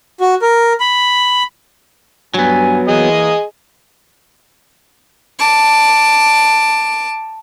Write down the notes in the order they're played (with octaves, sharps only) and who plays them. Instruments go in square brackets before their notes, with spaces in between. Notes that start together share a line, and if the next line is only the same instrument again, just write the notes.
[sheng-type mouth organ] F#4
A#4
B5
[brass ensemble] G2 G#5 [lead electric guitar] F#3 B3
[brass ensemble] E3 A#3 [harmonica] G#4 D#5
[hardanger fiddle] A5 D6